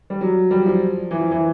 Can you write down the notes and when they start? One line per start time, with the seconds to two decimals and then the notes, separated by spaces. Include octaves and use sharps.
0.10 G3
0.21 F#3
0.51 G3
0.66 F3
1.11 E3
1.21 F3
1.31 E3